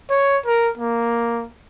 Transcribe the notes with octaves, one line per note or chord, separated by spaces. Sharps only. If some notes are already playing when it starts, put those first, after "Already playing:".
C#5
A#4
A#3